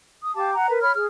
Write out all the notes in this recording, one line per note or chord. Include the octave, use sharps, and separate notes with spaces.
D#6
G4 F5 A5 D6
F#5 A#5
A#4 B4
C#5 B5 F6
G#4 F6